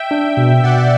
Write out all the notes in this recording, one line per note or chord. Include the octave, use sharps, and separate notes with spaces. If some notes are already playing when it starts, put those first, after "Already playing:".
Already playing: E5 G5
D4
B2
B2 D5 F#5